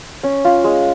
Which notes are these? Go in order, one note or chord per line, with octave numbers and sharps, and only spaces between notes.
C#4
F4
G#3